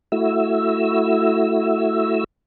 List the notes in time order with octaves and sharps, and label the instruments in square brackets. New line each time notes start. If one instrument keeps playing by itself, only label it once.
[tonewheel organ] A3 E4 F#4 E6